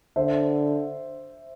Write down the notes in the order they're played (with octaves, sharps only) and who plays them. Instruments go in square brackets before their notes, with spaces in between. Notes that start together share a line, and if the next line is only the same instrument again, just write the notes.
[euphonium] D3 [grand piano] C5 E5